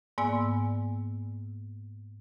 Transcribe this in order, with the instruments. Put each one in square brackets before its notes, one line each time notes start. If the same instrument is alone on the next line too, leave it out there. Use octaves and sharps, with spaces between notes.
[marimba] G#2 A#3 B3 D5 G#5 E6